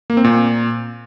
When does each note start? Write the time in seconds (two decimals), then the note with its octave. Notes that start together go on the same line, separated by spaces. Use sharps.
0.10 A#3
0.17 C4
0.24 A#2